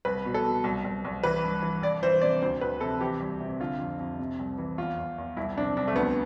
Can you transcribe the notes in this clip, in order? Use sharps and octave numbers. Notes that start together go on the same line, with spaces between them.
C2 B4
B2
A4
B2
C2
C2
C2
E3 B4
G2
E3
C2 D5
E3 C5
C3 D5
D2 C5
D2 B4
C3 A4
E3 G4
C2
C3
D3 F4
F2
F2
C3
C2
E3
E2 F4
E2
E2
C2 E4
C3 D4
C2 D4
A3
D2 B3